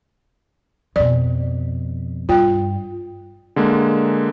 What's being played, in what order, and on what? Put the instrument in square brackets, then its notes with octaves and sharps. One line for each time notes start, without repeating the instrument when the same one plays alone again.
[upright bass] F2 B2 [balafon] D5
[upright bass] G2 [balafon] F4 G5
[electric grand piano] D3 G#3 A#3